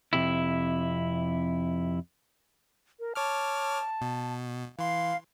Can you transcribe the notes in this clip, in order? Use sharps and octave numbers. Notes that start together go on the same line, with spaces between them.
F2 C3 E4
A#4
C#5 A5 D6 F6
B2
E3 F5 C6